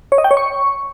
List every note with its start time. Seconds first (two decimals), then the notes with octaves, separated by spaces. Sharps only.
0.12 C#5
0.18 D#5
0.24 G5
0.31 C#5
0.37 C#6